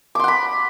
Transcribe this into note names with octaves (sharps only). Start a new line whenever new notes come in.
F#5 B5 C6 D6